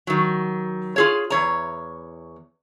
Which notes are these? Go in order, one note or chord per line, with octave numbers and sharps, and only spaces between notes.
D#3 F#3
F4 G#4 C#5
E2 C#5 A#5